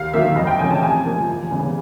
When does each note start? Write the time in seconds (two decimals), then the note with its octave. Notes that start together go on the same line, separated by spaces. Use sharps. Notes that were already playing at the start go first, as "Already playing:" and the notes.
Already playing: D#2 F5
0.13 D#3 F#3 A#3 E5
0.36 F2 D#5
0.47 G5
0.59 C#3 E3 A3 C#4 G#5
0.71 A5
0.82 C3 G#5
1.06 F3 A#3
1.28 E2
1.51 C#3 E3 G3 B3